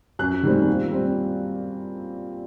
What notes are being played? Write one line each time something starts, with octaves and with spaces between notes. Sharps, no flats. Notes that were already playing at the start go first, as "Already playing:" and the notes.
F#2 F#6
D#3 G3 C4
A#2
G3 C4